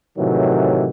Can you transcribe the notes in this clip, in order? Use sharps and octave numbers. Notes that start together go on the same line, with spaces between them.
A2 C3 D#3 E3 F#3